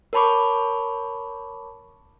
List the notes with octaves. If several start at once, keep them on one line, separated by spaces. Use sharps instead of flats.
A#4 C#5 A5 B5 C#6 D6